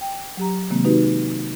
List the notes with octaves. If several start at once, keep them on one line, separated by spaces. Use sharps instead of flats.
G5
F#3 G4 A#5
C3 D#3 F#3 G#3 A#3 C4
D#4 F#4 G4 B4